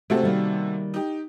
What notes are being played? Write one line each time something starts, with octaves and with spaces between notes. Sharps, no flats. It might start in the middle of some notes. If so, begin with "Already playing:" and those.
C3 A3 C4 F#4 A4
D#3 G3 A#3
D#4 G4